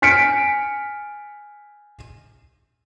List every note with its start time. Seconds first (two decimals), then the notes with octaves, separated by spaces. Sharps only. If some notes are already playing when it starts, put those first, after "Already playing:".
0.02 G#5 F6 B6 C#7 D7